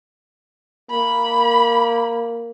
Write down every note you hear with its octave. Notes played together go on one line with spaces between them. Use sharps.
A#3 B5